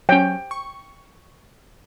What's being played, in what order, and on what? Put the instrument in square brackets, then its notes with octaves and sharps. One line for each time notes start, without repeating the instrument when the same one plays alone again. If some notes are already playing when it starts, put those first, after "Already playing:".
[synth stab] F#3 C#4 [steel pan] G5
[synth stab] C#6